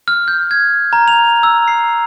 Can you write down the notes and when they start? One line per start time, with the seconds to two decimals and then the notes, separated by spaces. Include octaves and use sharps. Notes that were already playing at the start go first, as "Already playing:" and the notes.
0.08 F6
0.28 G6
0.51 G#6
0.93 A#5
1.08 F7
1.43 E6
1.68 C7